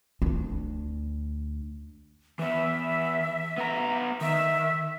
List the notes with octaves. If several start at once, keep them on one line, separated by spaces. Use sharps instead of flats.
D2 D4
E3 B3 E5
B3 A#5
D#3 E5